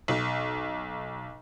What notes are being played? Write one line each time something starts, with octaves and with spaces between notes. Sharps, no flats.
B1